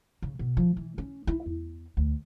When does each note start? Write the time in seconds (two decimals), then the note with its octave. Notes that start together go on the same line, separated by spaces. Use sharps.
0.22 C#3
0.39 B2
0.57 F3
0.77 E3
0.98 C#4
1.27 E4
1.46 E2
1.97 D2